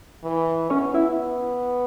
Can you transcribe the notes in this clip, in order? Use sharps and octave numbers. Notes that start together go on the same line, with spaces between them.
E3
B3 C#4 C#5
E4 E5